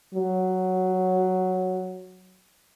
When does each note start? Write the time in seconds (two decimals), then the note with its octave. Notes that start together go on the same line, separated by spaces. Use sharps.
0.14 F#3